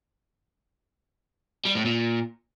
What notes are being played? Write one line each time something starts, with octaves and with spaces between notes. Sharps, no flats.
G3
A2
A#2